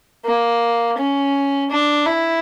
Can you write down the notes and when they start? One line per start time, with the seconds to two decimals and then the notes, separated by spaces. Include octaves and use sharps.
0.25 A#3
0.98 C#4
1.71 D4
2.06 E4